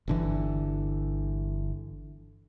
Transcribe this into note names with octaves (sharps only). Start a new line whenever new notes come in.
G1 D3 E3